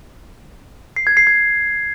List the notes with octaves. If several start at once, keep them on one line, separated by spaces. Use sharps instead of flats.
C7
G#6
C7
G#6